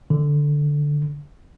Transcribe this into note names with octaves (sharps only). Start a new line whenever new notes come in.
D3